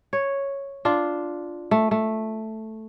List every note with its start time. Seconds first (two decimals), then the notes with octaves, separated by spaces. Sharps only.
0.13 C#5
0.85 D4 F4
1.71 A3
1.91 A3